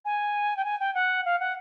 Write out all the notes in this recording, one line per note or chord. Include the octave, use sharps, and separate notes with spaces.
G#5
G5
G#5
G5
F#5
F5
F#5